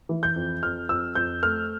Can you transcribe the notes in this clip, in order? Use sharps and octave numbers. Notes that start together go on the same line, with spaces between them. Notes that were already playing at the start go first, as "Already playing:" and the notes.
E3
G6
F2
F2 F6
F2 E6
F2 G6
A3 F6